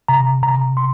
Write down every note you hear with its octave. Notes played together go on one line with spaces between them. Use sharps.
C3 A#5
C3 A#5
C6